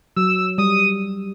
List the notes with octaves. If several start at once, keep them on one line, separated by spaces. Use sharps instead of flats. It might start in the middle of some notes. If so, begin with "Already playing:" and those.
F#3 E6
G3 D#6